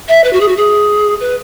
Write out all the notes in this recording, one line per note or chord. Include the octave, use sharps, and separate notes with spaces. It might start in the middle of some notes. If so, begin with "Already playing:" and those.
E5
B4
F#4
G#4
F#4
G#4
B4